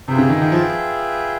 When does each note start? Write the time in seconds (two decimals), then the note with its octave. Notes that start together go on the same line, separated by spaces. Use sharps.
0.08 C3 F4 G#4 B4 E5 G5
0.18 C#3
0.29 D#3
0.42 D#3
0.52 F3